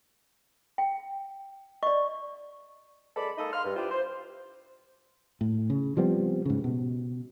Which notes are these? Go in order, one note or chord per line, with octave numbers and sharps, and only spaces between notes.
G5
D5 D#5 C#6
F#2 G#3 A4 D5 B5
G#3 A#3 D#4 A4 D#5
F5 C6 F6
G2
D4 E4 F4 G4 B4 C5
C5
A2
C#3
F3 G3 B3 C4
G#2 C#3
B2